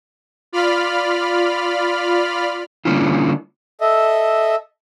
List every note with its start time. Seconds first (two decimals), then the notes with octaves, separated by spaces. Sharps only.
0.52 F4 D5 B5 F6
2.85 D3 G3 A#3 C#4 E4 F4
3.81 A4 D#5 E5